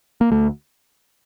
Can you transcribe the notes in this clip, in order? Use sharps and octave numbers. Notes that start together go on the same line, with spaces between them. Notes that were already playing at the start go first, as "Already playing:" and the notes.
A#3
D2 A3